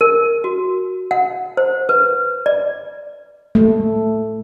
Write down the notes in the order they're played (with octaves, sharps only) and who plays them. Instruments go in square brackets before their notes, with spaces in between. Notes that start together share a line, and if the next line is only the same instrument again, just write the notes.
[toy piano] A#4
F#4
F#5
C5
B4
D5
[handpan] A3